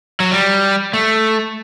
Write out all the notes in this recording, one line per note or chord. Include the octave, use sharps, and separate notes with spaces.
F#3
G3
A3